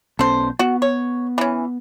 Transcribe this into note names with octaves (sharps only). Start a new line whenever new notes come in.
B1 B3 C#4 A4 C5
B3 F#4
C#5
E3 C#4